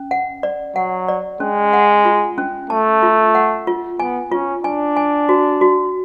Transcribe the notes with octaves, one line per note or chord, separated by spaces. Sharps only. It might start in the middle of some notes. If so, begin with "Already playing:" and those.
Already playing: C#4
F#5
D5
F#3 F#5
D5
G#3 C#4
F#5
F4
C#4
A3 A5
F4
F#5
F4
B3 G#5
C#4 F4
D4 G#5
G#5
F#4
F#4